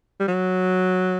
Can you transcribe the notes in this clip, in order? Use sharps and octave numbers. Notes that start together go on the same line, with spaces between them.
G3
F#3